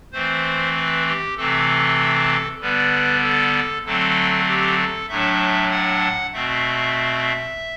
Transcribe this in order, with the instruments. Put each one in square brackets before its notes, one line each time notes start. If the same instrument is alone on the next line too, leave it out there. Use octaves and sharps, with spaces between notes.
[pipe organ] E3 A3 C4 C5
B4
G4
C3 E3 A3 C4 A4
D3 G3 B3 B4
A4
D3 F#3 A3 C4 A4
G4
A4
A2 F#3 A3 D4 E5
F#5
B2 A3 C4 E5